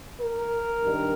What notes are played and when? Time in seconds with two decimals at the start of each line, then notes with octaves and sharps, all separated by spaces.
0.21 A#4
0.82 G2 D#3